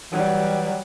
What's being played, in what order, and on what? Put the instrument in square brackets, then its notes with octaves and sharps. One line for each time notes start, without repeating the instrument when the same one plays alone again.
[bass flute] E3 [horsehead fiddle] F#3 G3